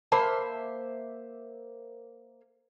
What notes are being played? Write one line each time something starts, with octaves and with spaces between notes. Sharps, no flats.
A#3 C5 E5 A5 B5